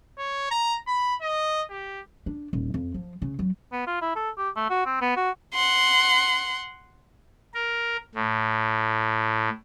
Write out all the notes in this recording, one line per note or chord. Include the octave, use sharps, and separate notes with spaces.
C#5
A#5
B5
D#5
G4
D4
D#1
F2
F3
C#3
F#3
B3
F4
E4
A4
G4
A3
F#4
C4
B3
F#4
F#5 C6
A#4
A2